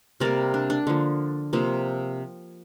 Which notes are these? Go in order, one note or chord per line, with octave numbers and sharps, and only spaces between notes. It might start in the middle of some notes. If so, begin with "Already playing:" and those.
C3 G3 A#3 A#4 D5
D4
D4
D3 F3 A#3
C3 F3 A#3